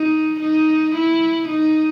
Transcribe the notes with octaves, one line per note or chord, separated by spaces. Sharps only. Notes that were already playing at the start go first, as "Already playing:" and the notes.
Already playing: D#4
D#4
E4
D#4